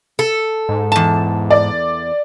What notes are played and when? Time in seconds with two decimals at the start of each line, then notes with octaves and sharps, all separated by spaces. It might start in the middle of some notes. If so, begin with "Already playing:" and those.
0.19 A4
0.69 G#2
0.92 E2 A5
1.51 D5